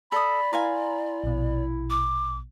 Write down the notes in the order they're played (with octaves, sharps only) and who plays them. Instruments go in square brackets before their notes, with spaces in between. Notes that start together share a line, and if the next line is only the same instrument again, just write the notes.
[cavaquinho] A4 D#6 [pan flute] D5 [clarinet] B5
[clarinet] E4 [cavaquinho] B4 F5 G#5 [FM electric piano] A#5 C6
[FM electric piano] A#1 B2
[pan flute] D6